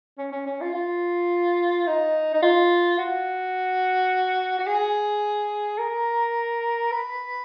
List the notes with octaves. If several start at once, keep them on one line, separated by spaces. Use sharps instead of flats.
C#4
C#4
C#4
F4
F4
D#4
D#4
F4
F#4
F#4
G#4
A#4
B4